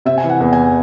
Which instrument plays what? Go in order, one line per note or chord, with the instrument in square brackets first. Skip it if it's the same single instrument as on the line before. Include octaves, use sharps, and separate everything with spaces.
[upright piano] C3 [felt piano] E5
[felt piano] G#5
[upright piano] E3
[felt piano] F#5
[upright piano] E2
[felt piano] G#5